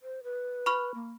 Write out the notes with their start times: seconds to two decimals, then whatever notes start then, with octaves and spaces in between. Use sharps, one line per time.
0.02 C5
0.24 B4
0.66 B5 C#6 F6
0.95 A#3